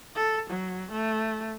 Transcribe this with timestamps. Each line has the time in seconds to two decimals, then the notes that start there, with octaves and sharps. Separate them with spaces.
0.15 A4
0.50 F#3
0.91 A3